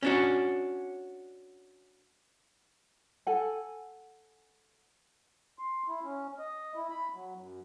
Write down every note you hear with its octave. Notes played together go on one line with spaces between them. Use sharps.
C#4 D4 F#4
A4 F#5 G#5
C6
E4
C#4
D#5
E4
B5
F#3
F#2